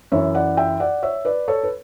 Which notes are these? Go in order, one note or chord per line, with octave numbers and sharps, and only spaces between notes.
F#2 E3 C#5 E5
D5 F#5
E5 G5
D5 F#5
C#5 E5
B4 D5
A4 C#5
B4